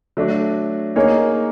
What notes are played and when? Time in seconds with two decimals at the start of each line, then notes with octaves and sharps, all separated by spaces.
0.17 F#3 A3 D4
0.96 A#3 D#4 G#4 C#5